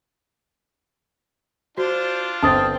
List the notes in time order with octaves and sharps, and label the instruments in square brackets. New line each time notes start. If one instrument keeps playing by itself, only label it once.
[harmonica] D4 F4 [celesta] F#4 [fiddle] C5
[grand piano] G1 [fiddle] C4 [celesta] A5 D#6 A6